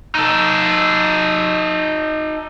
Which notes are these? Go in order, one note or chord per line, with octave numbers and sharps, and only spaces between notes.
D#4 A4